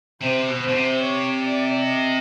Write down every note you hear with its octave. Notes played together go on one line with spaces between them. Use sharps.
C3 C5
B2
C5
B2
C3
C#5
D5
D#5